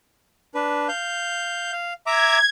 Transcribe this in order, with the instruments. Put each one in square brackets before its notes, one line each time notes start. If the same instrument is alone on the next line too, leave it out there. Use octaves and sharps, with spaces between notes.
[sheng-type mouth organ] D4 B4
F5 G6
F5
[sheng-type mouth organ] E5 A#5 D6 [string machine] G#6